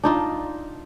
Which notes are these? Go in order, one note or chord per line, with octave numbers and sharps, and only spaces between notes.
D4 D#4 F4